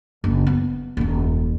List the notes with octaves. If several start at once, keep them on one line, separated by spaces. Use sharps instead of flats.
F#1
B3
D#1 F#2